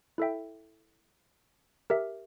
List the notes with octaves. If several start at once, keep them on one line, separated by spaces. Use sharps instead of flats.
E4 A4 E5 G5
G4 A#4 E5